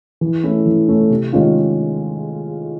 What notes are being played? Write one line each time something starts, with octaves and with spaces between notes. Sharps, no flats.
E3
A3 C#4 E4
E3
A3 C#4 E4
C3
D#3 G#3 C#4 F4